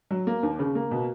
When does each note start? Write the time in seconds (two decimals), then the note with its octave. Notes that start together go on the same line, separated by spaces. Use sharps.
0.11 F#3
0.27 A#3
0.43 D#2
0.59 C#3
0.75 A#3
0.91 B2